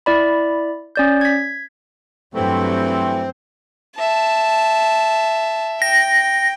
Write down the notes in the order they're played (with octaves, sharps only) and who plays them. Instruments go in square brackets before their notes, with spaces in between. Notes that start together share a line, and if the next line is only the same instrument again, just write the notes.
[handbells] E4 D5 B5
C#4 D5 G6
G#6 B6
[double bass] G2 F#3 [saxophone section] E3 G3 A3 [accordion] C4
[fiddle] E5 [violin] A5
[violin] G5 [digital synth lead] A#6